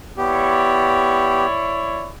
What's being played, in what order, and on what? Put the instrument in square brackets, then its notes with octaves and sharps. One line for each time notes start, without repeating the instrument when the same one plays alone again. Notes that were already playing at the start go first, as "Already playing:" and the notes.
[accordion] B3 G4 [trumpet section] E4 C#5 D5